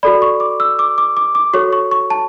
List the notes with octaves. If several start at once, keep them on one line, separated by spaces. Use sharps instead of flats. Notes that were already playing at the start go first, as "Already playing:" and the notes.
F#4 A4 D5 B5
C#6
D6
E6
D6
D6
D6
D6
F#4 A4 C#5 C#6
C#6
C#6
A5